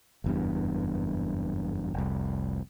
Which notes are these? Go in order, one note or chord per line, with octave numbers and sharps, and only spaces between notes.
F#1 E2 G2
F1 C2